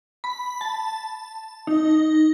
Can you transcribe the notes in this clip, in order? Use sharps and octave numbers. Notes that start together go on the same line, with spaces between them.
B5
A5
D#4